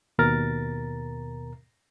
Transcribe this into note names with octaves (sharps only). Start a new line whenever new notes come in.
D#2 B2 A#4 A#5 A6